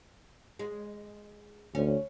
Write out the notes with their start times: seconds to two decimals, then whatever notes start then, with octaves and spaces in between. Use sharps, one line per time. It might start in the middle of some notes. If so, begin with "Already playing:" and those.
0.59 G#3
1.75 D2 C#4